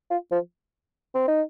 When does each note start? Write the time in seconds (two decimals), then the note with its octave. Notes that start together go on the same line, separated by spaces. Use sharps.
0.11 F4
0.32 F3
1.15 C4
1.28 D#4